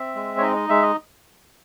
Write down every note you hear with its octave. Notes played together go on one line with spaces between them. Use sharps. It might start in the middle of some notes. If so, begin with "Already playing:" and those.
Already playing: C4 E5
G#3
C#5
D#4 D#5
D#5
G#3 E5
D#5